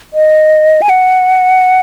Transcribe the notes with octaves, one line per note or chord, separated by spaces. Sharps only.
D#5
G#5
F#5